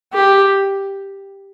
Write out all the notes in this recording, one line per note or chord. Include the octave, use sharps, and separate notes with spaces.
G4